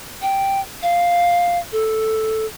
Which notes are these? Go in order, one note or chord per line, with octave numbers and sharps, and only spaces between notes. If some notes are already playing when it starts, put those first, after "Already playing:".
G5
F5
A4